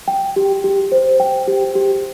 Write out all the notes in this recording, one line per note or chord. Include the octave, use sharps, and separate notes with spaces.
G5
G4
G4
C5
G5
G4
G4